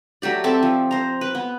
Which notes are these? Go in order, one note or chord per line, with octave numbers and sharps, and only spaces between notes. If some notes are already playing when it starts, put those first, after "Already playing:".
F#3 A3 G4 D5
C4 A4 E5 A5
F3
C5 A#5
B4
B3